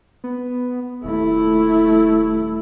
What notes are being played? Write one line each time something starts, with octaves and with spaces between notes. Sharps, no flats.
B3
D#1 A3 E4